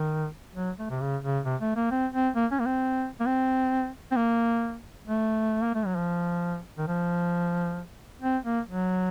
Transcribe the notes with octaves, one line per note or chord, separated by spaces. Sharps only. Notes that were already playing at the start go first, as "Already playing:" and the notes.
Already playing: D#3
F#3
A3
C3
C#3
C#3
C3
A3
A#3
C4
C4
A#3
C#4
A#3
C4
A#3
C4
C4
A#3
A3
A#3
A3
F#3
F3
D#3
F3
C4
A#3
F#3